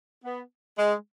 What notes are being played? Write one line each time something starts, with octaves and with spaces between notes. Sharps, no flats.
B3
G#3